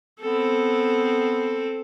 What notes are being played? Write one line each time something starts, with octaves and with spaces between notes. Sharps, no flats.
B3 C4 A4